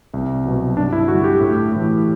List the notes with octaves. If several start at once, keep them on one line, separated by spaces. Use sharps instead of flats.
C2
B2 F#3
G2 D4
E4
D3 G3 F#4
G4
A2
E3 A3